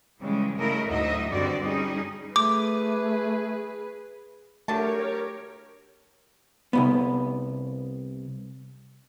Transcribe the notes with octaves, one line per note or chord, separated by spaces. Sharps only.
C#3 E3 G3 G#3
C#3 A3 E4 A#4 D#5
D2 A2 F#3 D#4 D#5 E5
G2 D3 G3 C4 F#4 D5
G3 C#4 D#4 G#4
A3 G#4 B4 D6
D3 F#3 A3 G4 A#4 C#5 A5
C2 G2 B3